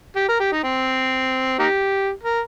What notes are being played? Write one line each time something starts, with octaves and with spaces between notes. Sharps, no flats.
G4
A#4
G4
D#4
C4
A#3 D#4 G4
A#4